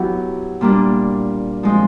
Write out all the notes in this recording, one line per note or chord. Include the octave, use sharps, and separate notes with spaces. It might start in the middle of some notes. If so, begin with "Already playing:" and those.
Already playing: F#3 B3 E4 G4
A#2 G3 A#3 D4
F3 G#3 C4